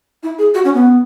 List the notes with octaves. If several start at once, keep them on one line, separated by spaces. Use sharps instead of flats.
E4
G#4
F#4
C#4
B3